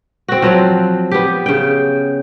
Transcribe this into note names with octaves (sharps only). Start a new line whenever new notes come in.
C4 F#4
F3 F#3 C4
B3 G4
C#3 G5